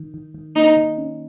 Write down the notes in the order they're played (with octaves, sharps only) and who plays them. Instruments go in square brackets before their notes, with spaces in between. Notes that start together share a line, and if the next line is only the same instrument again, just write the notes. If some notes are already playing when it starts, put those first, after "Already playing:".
Already playing: [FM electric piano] D#3
D#3
D#3
[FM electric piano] A#3 [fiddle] D#4
[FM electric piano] D#3
C#4